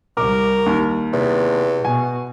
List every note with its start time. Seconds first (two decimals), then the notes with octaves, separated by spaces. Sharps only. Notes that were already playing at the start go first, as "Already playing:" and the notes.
0.17 C2 A#4 D6
0.66 D#2
1.13 E2 C3
1.85 B2 G#5